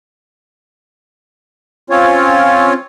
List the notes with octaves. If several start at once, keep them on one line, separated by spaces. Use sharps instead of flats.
C4 C#4 F4 C#5